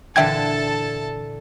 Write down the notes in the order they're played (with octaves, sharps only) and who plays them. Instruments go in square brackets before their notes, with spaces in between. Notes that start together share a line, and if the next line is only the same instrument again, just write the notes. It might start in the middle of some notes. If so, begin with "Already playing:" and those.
[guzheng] A#2 D3 E3 [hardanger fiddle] A4 A5 [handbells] E5 G5 G#6